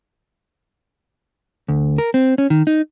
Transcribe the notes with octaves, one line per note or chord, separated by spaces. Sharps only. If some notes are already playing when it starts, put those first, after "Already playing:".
D2
A#4
C4
C#4
D#3
D#4